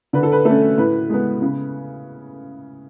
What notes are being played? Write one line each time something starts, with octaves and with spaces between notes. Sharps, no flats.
D3 B4
A4
B4
A3 C#4 A4
A2 B4
G#3 B3
C#3